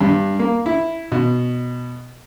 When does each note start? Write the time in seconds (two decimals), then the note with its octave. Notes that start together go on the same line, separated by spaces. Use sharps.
0.01 G2
0.39 A#3
0.66 E4
1.12 B2